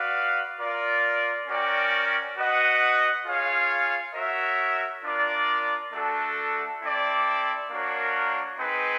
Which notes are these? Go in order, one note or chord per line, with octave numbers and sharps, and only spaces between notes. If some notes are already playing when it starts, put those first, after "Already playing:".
Already playing: F#4 B4 D5 F5
F4 A#4 D5
C#4 F#4 A#4 D5 G5
F#4 B4 D#5 F#5
F4 G#4 C#5 F5
F#4 A#4 C#5 E5
D4 F4 A#4 D5
A3 D4 F#4 A4
C4 E4 A4 D5
A#3 D4 F#4 A#4 C#5
C4 D#4 G#4 B4